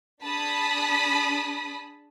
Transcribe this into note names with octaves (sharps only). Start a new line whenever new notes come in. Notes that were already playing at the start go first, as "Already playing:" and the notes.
D4 G#4 A5 B5 D#6 B6